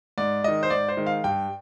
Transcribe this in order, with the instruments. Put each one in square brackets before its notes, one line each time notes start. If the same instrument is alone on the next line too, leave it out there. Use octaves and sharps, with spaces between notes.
[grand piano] G#2 D5
D#3 G#3 D#5
C5
G#2 D5
C5
D#3 G#3
F5
G2 G5